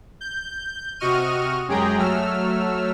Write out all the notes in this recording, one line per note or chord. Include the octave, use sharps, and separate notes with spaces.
G6
C3 F#4 D#5 C#6 F6 D#7
F#2 G#3 G4 G#4 G5 A#5
F#3 A3 E6 F6